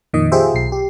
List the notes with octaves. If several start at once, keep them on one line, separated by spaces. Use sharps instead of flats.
F2 A#2 D#3 D#5
F4 G4 G#4 C5 E5
B1 C7
G4